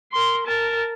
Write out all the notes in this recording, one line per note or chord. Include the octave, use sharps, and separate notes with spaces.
A#4 C6
A#4 A5